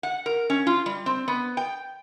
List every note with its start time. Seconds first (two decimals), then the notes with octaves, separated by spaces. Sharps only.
0.03 F#5
0.26 A#4
0.50 C#4
0.67 F4
0.86 G3
1.06 C4
1.28 B3
1.57 G5